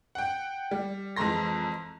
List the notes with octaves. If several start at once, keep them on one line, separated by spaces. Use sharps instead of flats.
F#5 G5
G3
F2 E3 G#3 A#5 C6 A#6